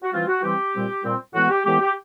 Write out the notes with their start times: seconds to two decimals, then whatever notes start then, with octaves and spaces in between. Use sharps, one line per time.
0.02 F#4
0.12 E3 G3 C4 F4
0.28 F#4
0.43 E3 G3 C4 G4
0.74 A#2 G3 C4
1.04 A#2 G3 C4
1.34 A2 E3 G#3 B3 F#4
1.50 G4
1.65 A2 E3 G#3 B3 G4
1.80 G4